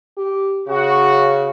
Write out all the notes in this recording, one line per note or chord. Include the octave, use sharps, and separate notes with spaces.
G4
C#3 F#4